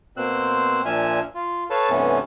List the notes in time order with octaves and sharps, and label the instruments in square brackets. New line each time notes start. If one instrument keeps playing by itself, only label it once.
[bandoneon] B2 A#3 C4 C5 E6 F#6
A#2 F3 D4 E5 G#5 F6
F4
A4 B4 C#5 F5 A5
G2 C3 E3 A3 B3 C#4